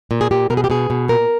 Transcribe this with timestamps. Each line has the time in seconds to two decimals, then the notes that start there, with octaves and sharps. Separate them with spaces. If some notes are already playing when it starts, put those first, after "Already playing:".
0.11 A#2
0.21 G#4
0.31 A#2 G4
0.50 B2 A#4
0.57 G#4
0.64 G4
0.70 B2 G#4
0.90 B2
1.08 A#2 A#4